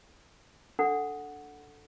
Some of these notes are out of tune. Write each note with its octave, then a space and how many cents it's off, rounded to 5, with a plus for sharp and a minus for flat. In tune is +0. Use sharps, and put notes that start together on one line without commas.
D4 +0 A4 +0 F#5 +0